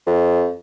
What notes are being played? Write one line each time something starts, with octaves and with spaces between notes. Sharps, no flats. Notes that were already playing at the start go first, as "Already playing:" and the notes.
F2